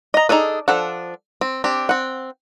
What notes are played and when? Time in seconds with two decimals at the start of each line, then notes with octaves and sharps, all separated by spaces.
0.14 D#5 A#5
0.29 D4 D#4 G#4 A4 B4
0.68 F3 D4 A4 F#5
1.41 C4
1.64 C4 D4 G4
1.89 C4 F#5